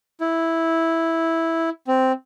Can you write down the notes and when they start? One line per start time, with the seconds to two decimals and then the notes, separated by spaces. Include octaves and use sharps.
0.20 E4
1.87 C4